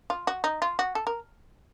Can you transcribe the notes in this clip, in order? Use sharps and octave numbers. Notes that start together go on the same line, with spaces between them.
F4
F#4
D#4
F4
F#4
A4
A#4